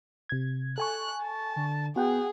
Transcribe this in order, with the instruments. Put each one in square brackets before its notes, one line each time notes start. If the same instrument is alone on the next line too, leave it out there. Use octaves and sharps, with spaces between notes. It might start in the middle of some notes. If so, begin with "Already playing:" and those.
[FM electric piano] C3 G#6
[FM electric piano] A4 G#5 C#6 [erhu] F#6
[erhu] A5
[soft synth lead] D3
[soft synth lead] B3 [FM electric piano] F#4 F#5 G5 [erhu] G#4